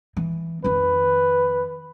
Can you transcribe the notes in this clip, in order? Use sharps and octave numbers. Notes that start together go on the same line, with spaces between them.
E3
F2 D#3 B4